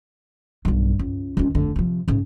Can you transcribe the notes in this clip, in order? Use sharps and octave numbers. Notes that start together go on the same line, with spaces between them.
B1 G2
C#2
C#2 D#3
F1 D3
C3 F3
G#2 C#3